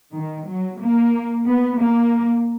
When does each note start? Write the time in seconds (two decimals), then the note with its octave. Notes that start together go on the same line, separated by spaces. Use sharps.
0.14 D#3
0.48 F#3
0.81 A#3
1.47 B3
1.79 A#3